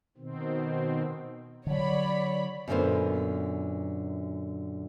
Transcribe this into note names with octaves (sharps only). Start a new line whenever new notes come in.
B2 D#3 C4
D3 F#3 C#5 D5 B5
F#2 A#2 D3 A#3 B3 C5